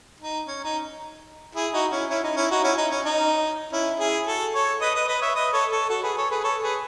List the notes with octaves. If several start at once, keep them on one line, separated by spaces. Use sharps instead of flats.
D#4
C#4
D#4
E4 G#4
D#4 F#4
C#4 E4
C#4 E4
D#4
C#4 E4
D#4 F#4
C#4 E4
D#4
C#4
D#4
C#4 E4
E4 G#4
F#4 A4
A4 C#5
B4 D#5
B4 D#5
B4 D#5
C#5 E5
B4 D#5
A4 C#5
A4 C#5
F#4 A4
G#4 B4
A4 C#5
G#4 B4
A4 C#5
G#4 B4